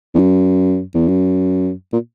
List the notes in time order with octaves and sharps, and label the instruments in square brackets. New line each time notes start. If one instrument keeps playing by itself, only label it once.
[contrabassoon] E2
F#2
E2
F#2
A#2